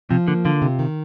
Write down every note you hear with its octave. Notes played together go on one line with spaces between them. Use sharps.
C3 F3
D3 A#3
D3 F4
C3
D#3